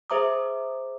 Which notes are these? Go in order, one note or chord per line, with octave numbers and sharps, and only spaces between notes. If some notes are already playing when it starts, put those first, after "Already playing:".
G#4 C5 E5 A#5 D6 D#6